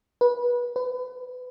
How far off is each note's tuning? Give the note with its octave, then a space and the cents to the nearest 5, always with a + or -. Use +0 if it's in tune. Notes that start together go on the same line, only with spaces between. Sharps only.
B4 -25
B4 +30